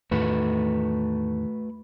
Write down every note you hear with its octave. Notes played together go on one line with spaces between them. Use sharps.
E2 A2 D#3 A3 F#4 B4